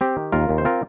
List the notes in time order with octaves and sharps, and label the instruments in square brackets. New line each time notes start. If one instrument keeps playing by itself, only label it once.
[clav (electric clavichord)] C4 G4
D#3
D#2 F4 A#4
D#2
C5
C4 F4 A#4